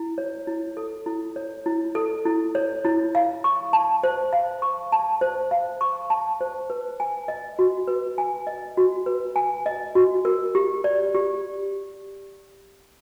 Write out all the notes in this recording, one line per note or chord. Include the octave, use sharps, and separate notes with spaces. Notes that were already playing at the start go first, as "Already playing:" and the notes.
Already playing: E4
C#5
E4
A4
E4
C#5
E4
A4
E4
C#5
E4
F5
C#6
A5
C5
F5
C#6
A5
C5
F5
C#6
A5
C5
B4
G#5
D#5
F#4
B4
G#5
D#5
F#4
B4
G#5
D#5
F#4
A#4
G4
D5
G4